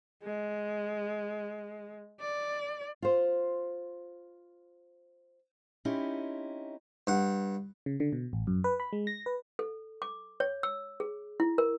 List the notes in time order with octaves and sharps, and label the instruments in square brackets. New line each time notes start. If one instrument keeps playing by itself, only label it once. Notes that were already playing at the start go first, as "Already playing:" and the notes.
[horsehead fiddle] G#3
D5
[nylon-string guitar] F4 C5
[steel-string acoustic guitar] C4 C#4 D#4 E4 G4
[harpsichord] G2 F#5
[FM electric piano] C#3
D3
B2
A1
F#2
B4
B5
G#3
A#6
B4
[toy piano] A4
D6
C#5
E6
G#4
E4
A#4